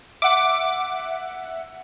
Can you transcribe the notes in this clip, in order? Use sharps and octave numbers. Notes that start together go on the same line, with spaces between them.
E5 F#5 D6